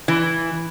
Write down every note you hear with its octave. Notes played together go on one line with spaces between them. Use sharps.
E3